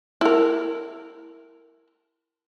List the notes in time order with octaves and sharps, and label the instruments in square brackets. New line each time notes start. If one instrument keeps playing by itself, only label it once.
[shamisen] E4 A#4